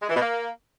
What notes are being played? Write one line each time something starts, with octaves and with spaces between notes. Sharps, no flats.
G#3
E3
B2
A#3